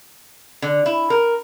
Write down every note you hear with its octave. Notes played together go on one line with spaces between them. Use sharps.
D3
E4
A#4